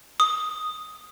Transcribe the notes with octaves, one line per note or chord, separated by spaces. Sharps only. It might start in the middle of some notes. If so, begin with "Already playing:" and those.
D#6